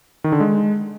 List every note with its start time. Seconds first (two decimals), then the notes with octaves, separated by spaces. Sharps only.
0.24 D#3
0.32 D3
0.40 G#3